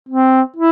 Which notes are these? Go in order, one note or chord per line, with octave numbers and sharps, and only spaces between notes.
C4
E4